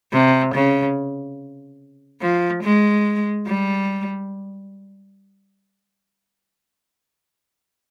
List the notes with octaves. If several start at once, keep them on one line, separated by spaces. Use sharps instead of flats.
C3
C#3
F3
G#3
G3